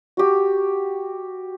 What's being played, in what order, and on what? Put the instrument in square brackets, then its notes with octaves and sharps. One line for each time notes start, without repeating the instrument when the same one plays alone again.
[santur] F#4 G4